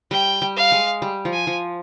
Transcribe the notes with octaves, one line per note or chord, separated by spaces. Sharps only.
G3 G5
G3
F5
G#3
G3
F3
G#5
F3